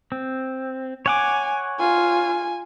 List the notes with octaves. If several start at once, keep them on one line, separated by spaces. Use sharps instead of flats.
C4
C#5 F#5 G#5 D6
F4 G#5